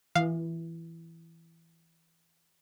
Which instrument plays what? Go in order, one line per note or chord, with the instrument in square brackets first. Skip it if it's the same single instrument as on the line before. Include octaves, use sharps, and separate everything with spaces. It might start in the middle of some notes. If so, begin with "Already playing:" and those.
[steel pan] E3 [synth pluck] F5